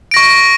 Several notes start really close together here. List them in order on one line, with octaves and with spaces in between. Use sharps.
D7 A#6 C#6